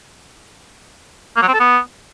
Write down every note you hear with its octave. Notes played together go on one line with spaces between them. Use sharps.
A#3
F#3
C4
A4
B3